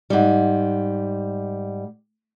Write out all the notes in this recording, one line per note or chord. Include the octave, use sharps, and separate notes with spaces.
G#2 G3